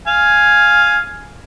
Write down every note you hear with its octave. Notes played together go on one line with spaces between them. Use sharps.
F5 G#5